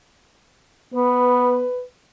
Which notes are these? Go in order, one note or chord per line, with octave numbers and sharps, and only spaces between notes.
B3 B4